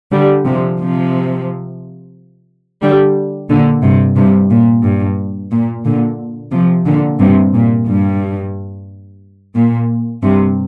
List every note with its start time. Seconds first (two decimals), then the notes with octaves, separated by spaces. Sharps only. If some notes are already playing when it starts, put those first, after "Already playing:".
0.12 D3 G3
0.45 C3 F3
0.80 C3 F3
2.82 D3 G3
3.49 A#2 D3
3.83 G2 C3
4.16 G2 C3
4.50 A#2
4.83 G2
5.52 A#2
5.85 A#2 D3
6.52 C3 F3
6.86 A#2 D3
7.19 G2 C3
7.54 A#2
7.87 G2
9.55 A#2
10.23 G2 C3